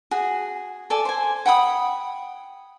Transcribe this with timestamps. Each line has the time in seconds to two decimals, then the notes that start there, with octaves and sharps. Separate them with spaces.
0.11 F#4 G#4
0.90 A4 D5 G#5
1.05 C5 G#5
1.46 F#5 G5 B5 D#6